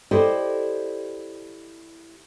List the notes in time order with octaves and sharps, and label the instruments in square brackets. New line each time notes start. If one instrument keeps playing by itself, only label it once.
[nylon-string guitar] E4 G4 A4 C5 D5 D#5